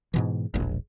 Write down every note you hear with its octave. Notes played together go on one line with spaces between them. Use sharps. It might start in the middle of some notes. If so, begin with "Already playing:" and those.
G#2 B2 E3
E1 A#1